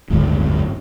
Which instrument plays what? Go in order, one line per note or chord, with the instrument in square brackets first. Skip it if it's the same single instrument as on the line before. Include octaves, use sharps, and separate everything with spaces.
[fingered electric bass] F#1 D2 G#2 D#3